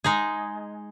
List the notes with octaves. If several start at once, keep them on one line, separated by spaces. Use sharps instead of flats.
G#3 D#4 G#4